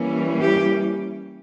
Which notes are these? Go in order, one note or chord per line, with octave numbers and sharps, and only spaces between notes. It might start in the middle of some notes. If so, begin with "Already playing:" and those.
Already playing: E3 G3 A#3 C#4
G4